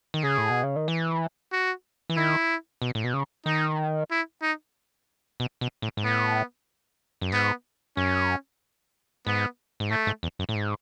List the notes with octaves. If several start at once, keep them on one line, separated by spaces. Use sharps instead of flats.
D#3
C#3 G#4
A2
B2
C#3
D#3
E3
F#4
E3
D#3 E4
B2
A2
B2
C#3
D#3 D#4
E4
D#4
B2
B2
A2
G#2
A2 B3
F#2
G#2 B3
F#2 C#4
G#2 B3
G#2
A2 A3
G#2
E2
F#2
A2
G#2